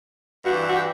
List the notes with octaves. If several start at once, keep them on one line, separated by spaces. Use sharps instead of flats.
G2 E3 F#4
E4
F#4
G4